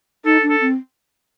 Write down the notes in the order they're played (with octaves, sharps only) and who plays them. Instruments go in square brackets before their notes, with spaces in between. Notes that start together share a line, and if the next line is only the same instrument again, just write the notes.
[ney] D#4 [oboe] A4
[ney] D4
[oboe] A4
[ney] C4